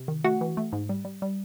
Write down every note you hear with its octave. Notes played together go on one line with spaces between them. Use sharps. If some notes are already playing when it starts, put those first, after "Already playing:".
Already playing: C3
D#3
A3 F#4 F#5
E3
A3
G#2
G3
G3
G3